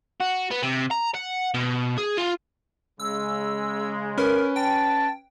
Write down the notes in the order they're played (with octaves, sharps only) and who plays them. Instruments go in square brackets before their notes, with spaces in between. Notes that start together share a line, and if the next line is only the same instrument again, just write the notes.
[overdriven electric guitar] F#4
B3
C3
A#5
F#5
B2
G#4
F4
[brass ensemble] C#3 G#3 [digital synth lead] E6
[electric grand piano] C#4 B4 [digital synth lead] A#4
[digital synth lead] G5 [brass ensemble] A5